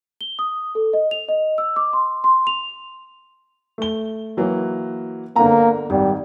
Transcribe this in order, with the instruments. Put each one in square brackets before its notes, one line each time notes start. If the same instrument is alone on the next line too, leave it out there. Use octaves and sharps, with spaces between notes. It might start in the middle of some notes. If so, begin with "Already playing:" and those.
[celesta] G7
D#6
A4
D#5
F7
D#5
E6
D6
C6
C6
F7
[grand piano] A3 G7
E3 F#3 A#3
[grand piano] G1 D3 A#5 [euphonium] A#3
[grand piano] G#1 [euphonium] G3